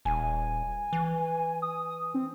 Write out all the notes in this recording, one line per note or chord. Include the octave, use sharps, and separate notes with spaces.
D#1 G#5
E3
D#6
C4